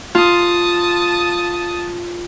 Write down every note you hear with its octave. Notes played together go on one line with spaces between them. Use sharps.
F4 A5 D#6